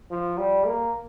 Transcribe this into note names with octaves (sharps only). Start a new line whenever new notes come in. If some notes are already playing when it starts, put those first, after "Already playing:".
F3
G3
A#3